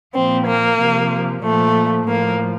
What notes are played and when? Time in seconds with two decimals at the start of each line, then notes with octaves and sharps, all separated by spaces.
0.15 A#2 F3 C4
0.47 A#3
0.79 C3 F3
1.43 A#2 F3 A3
2.08 A2 F3 A#3